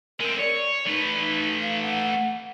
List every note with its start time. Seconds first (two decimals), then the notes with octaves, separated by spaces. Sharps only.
0.20 G#3 C4 A#4
0.39 C#5 D5
0.87 A3 D#4 B4
1.61 F5
1.81 F#5